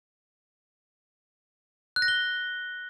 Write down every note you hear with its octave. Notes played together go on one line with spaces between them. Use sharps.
F#6
A#6
G7